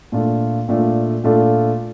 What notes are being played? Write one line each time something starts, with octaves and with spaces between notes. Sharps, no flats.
A#2 A3 D4 F4 A4
A#2 A3 D4 F4 A4
A#2 A3 D4 F4 A4